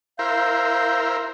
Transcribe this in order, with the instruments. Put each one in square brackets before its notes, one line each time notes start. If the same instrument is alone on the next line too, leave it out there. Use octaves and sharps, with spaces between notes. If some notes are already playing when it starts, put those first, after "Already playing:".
[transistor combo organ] E4 A#4 C5 [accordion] F5 G6